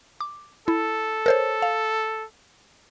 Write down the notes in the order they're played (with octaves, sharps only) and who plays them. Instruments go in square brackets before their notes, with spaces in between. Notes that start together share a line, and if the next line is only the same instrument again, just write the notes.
[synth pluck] D6
[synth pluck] E4 [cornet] A4
[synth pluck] A#4 C5 C#5
F5